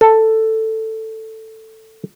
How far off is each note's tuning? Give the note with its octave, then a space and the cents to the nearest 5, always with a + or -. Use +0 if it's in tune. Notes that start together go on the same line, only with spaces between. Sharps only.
A4 +10